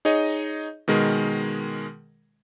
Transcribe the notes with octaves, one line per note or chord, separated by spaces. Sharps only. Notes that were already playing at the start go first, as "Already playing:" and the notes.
D#4 G#4 C#5 D#5
B2 D#3 G#3 A#4